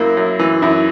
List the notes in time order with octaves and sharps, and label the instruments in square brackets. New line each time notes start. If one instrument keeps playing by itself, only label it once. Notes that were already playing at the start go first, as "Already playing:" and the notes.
Already playing: [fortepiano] F#2 A#3 [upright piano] E4
[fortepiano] F#2
E3
[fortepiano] F#2 [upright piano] E4